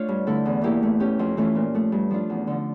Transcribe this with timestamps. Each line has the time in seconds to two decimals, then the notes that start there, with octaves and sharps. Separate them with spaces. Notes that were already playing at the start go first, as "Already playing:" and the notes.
Already playing: A3 D4 F4 C#5 F5
0.08 G2
0.27 D3 A3 E4 A4
0.45 E2
0.61 E3 A#3 E4 G4
0.83 A3
1.00 C#4 G4
1.19 F2
1.37 E3 A3 C#4 F4
1.55 A#2
1.74 F3 A3
1.92 G2
2.10 F3 A3 D4 F4
2.30 E2
2.47 D3 F3